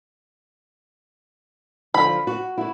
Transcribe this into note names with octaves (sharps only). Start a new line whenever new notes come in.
D3 F3 B5
F#4
E4 F#4